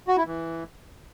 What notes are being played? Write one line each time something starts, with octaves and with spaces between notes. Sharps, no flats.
F#4
E4
E3